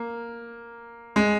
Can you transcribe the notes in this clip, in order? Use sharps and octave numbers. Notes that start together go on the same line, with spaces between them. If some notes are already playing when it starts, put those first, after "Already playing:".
Already playing: A#3
G#3